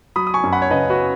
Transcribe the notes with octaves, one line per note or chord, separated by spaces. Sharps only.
F#3 B5 D#6
D#6
G#5 C#6
F#2
F#5 B5
C#5
C#3 B4 D#5
F#4 B4